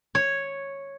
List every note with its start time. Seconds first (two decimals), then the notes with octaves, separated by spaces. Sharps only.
0.15 C#5